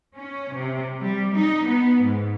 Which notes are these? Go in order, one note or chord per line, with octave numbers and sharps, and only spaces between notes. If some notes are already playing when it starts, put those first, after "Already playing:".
C#4
C3
G3
D#4
B3
G#2